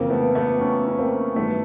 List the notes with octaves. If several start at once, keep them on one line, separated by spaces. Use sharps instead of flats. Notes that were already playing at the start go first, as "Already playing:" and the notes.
Already playing: F2 C#3 E3 A#3 C4
A3 B3
A3 B3
B3 C#4
C#4
A#3 C4
G2 D#3 F#3 A3 B3